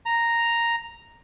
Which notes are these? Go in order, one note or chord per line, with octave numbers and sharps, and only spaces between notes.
A#5